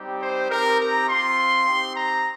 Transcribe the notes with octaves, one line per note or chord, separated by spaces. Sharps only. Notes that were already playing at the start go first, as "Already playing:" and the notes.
Already playing: G3 C4 D#4 G4
C5
C4 D#4 G4 A#4
A#5
C4 F4 C6
C4 D#4 G4
A#5